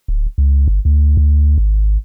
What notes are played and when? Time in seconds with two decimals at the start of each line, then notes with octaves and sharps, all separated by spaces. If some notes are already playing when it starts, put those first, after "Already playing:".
0.08 D1
0.38 C#2
0.68 G1
0.85 D2
1.17 D2
1.58 G#1